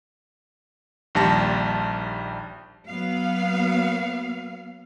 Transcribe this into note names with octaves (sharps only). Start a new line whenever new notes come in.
A#1 D#2 G3 A5 A#6
F#3 B3 F5